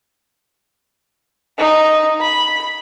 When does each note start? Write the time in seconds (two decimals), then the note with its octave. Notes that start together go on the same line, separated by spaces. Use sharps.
1.58 D#4
2.21 B5